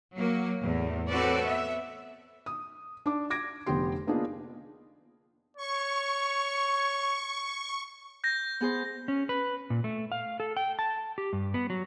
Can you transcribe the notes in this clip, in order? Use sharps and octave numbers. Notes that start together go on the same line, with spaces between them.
F#3 A#3
E2 A2
C4 F#4 A4 B4 C#5 D5
B3 E5
D#6
D4 D6
D6 G#6 A#6 D7
F1 D3 B3 G4 C6
A#3 B3 D4 D#4 F4 G#4
C#5 C#6
G6 A#6
B3 G#4 C5
C#4
B4
A#2
A3
F5
A4
G5
A5
G4
G2
B3
F#3